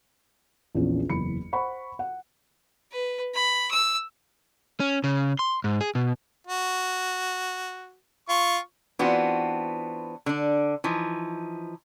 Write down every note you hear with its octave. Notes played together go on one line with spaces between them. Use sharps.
A#1 E2 C#4
F#1 E2 B5 C#7
C5 F#5 B5 C#6
F#5
B4
B5
E6
C#4
C#3
C6
G#2
G#4
B2
F#4
F4 C#6
E3 B3 C4 D4 F4 F#4
D3 D4
E3 F3 D#4